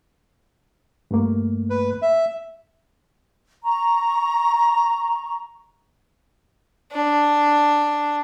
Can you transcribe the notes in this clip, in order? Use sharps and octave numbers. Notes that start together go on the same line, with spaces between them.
G2 A3 A#3
B4
E5
A#5 C#6
D4